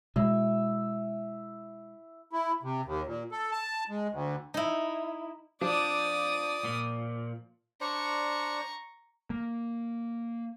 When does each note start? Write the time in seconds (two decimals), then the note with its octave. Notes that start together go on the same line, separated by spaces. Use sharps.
0.16 B2 G#3 E4 E5
2.33 E4
2.63 C3
2.85 D#2
3.07 A#2
3.32 A4
3.52 A5
3.89 G#3
4.12 D2
4.54 D#4 E4
5.61 F3 D4 D5 D#6
6.64 A#2
7.81 D4 C5 D5 A#5 C#6
9.30 A#3